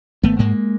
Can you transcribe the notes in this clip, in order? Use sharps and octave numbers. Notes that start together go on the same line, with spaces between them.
G#1 A3 B3
G#2 G#3 A#3